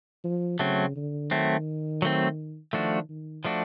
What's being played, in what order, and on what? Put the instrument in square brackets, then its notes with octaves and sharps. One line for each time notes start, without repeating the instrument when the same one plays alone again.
[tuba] F3
[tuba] C#3 [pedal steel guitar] F#3 A3 C4
[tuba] D3
[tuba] D#3 [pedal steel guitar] F#3 A3 C4
[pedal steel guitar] F#3 A3 C4
[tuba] D#3 [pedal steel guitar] F3 A3 D4 F#4
[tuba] D#3
[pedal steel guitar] F3 A3 D4 F#4